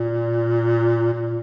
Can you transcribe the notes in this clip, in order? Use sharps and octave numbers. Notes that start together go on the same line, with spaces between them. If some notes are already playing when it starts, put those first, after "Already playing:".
Already playing: A#2
A#2